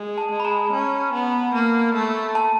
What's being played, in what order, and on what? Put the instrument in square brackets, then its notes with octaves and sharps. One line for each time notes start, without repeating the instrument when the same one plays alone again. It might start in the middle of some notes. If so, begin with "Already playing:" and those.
Already playing: [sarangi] G#3
[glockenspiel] A5
[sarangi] G#3
[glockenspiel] B5
A#5
[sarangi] C#4
B3
A#3
A3
[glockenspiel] A5